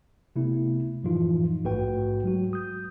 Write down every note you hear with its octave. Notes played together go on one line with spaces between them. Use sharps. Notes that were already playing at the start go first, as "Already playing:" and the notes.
C3 A3 B3 E4
F#2 A2 E3 F3 D#4 F4
A#1 G#2 A3 F#4 B4 G5
F#3 G#3 F#4
D#6 G6